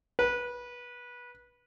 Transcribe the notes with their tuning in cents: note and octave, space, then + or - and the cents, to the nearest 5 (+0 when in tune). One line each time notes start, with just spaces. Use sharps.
B4 -20